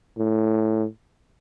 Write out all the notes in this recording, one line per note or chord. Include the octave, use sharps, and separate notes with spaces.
A2